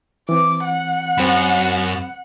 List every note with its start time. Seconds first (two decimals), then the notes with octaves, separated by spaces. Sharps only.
0.29 E3 C4 D6
0.65 F#5
1.18 F#2 C4 B5